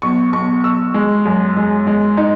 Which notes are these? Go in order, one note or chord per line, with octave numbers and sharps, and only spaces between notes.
B1 C#6
B1 C#6
B1 E6
G#3
F#2
G#3
G#3
D#4